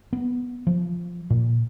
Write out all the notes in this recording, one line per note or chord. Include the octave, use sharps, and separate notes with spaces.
B3
F3
A#2